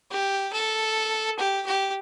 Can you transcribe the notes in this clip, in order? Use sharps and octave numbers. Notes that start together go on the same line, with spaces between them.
G4
A4
G4
G4